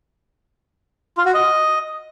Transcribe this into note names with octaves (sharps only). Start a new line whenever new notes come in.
F4
F#4
D#5